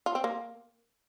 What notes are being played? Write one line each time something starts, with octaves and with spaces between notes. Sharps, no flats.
F4
C4
A#3